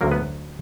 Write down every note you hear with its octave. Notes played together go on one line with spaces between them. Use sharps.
D2 D3 F#3 A#3 A#4
B3 B4